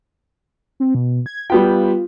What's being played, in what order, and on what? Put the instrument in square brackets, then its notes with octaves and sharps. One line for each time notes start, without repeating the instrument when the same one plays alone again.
[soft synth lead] C4
B2
G#6
[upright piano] G3 B3 G5 [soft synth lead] F4